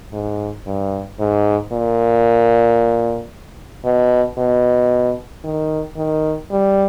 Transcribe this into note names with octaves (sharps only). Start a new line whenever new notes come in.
G#2
G2
G#2
A#2
B2
B2
D#3
D#3
G3